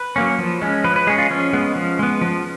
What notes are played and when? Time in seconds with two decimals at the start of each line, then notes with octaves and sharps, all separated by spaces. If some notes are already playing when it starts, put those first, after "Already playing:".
Already playing: B4
0.16 F#3 A#3 C#4
0.39 F3
0.62 G#3 C#4
0.84 F3 B4
0.96 B4
1.07 G#3 C#4 G#4
1.18 F4
1.30 F3 C#4
1.53 G#3 B3
1.76 F3
1.99 G#3 B3
2.21 F3